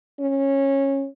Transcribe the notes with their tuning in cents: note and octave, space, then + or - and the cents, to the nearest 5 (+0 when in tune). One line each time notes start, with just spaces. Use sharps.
C#4 -15